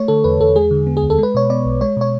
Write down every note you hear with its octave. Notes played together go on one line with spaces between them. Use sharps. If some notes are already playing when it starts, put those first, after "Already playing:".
Already playing: A3 C#5
D3 A4
E2 B4
E2 A4
G#3 G#4
D3
B3
G#4
D2
A4
G#3 B4
B2 C#5
B3 D5
B1
G#3 C#5
B2 C#5